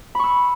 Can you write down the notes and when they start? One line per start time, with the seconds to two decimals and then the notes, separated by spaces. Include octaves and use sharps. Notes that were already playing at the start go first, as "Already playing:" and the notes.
0.15 B5
0.19 C#6
0.24 E6